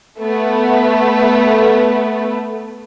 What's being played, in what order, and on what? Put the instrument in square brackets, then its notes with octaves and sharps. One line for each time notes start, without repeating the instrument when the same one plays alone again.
[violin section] A3 B3